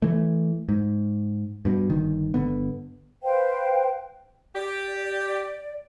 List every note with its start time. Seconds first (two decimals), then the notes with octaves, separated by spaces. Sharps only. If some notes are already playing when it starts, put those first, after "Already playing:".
0.02 E3 A3
0.69 G#2
1.65 G2 B2
1.90 G1 D#3
2.34 G1 D3 B3
3.23 B4 C5 F5 G5
4.55 G4 D5